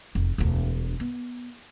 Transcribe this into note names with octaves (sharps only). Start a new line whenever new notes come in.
F1 E2
E1 D2
B3